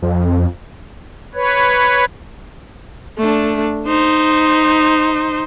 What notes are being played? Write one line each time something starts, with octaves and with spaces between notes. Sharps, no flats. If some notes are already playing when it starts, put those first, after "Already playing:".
F2
B4 C#5
A3 D4
D#4 C5